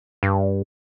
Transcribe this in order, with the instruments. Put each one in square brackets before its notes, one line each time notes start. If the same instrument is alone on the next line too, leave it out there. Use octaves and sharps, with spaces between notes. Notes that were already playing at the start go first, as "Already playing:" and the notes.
[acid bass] G2